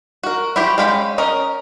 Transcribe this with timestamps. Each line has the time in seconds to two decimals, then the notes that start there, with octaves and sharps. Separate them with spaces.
0.23 F#4 A#4
0.56 E4 F#4 G4 C5
0.78 G#3 C#4 F5 G5 B5
1.18 C#4 A#4 D#5